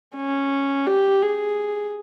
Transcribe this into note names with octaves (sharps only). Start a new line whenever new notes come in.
C#4
G4
G#4